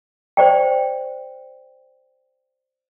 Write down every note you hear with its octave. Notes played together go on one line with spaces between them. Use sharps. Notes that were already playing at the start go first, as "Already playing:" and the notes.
C5 D5 G5